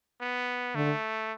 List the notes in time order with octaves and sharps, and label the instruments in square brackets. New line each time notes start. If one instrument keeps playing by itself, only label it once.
[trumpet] B3
[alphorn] D3 [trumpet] A3